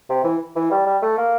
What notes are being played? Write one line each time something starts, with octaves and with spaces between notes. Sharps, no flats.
C3
E3
E3
G3
G3
A3
A#3